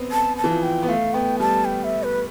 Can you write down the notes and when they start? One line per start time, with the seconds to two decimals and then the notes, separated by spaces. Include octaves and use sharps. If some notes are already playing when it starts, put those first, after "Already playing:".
Already playing: B3 C4
0.11 A5
0.37 A5
0.44 E3
0.50 F3
0.63 G5
0.83 B3
0.88 A3 F5
1.14 B3 G5
1.40 G3 A5
1.65 G5
1.84 E5
2.03 B4